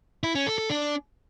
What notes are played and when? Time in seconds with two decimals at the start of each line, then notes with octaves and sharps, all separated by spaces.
0.24 E4
0.35 C#4
0.47 A4
0.58 A4
0.70 D4